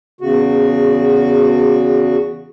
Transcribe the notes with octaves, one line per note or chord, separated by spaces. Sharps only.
E2 C#3 F#4